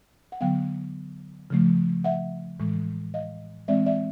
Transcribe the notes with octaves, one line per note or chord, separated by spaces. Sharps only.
F#5
D3 F#3 B3 F5 G5
C#3 F3 A3
E5 F#5
A2 E3 G#3
D#5 F5
E3 G#3 C4 D5 E5
D5 E5